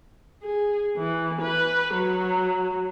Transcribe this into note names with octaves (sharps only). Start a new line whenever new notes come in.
G#4
E3
B4
F#3